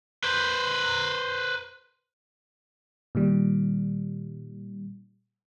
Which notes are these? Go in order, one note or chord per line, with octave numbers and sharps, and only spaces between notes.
B4 C5
A#2 D#3 G3